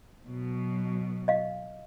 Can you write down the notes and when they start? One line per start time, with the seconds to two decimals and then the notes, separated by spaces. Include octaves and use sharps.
0.24 B2 F#3
1.28 D#5 F5